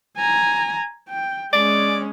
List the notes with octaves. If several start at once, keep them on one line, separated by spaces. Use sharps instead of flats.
G#5 A#5
G5
G#3 C#4 D5